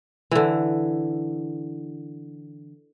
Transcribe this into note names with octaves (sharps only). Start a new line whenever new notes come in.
D3 E3